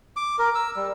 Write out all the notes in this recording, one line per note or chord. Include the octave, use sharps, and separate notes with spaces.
D6
A#4
E6
G3